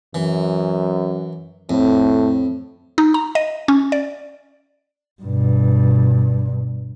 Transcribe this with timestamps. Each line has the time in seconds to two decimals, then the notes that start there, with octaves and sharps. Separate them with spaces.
0.15 F#2 E3
1.70 F2 A2
2.98 D#4
3.14 A#5
3.35 D#5
3.68 C#4
3.92 D5
5.22 G2 B2